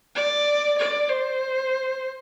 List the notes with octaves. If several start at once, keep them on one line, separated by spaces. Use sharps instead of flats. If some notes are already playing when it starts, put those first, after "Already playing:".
D5
D5
C5